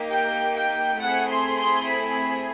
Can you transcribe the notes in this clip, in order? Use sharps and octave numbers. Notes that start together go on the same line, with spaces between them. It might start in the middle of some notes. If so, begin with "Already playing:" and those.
Already playing: A#3 D#4 G4
G5
G5
A3 C4 E4 G#4 F#5
C6
C6
B5